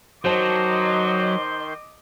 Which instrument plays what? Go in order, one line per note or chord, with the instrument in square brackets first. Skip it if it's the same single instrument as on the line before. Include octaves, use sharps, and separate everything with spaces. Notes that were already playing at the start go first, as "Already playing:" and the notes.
[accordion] D#3 C6 G6 [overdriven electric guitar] F#3 [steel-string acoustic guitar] C5 A5 [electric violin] D#5 D6